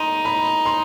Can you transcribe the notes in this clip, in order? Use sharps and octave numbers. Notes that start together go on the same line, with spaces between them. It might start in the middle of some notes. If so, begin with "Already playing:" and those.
Already playing: D#4 C6
B5
C6